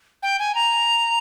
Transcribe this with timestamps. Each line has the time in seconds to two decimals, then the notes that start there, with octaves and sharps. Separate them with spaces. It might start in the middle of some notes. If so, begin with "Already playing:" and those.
0.23 G5
0.39 G#5
0.55 A#5